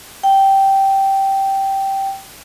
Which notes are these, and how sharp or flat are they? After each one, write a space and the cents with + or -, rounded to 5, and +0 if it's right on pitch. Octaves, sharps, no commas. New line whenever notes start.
G5 -10